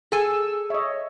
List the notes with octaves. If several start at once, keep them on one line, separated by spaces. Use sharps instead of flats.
G#4 A4 G#5 E6
C#5 D#5 E5